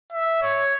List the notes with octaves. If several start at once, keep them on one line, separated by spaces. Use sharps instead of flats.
E5
C#5